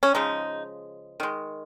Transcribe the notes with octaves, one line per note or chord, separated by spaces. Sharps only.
C#4
C#3 F3 G#3 D#4
D#3 G#3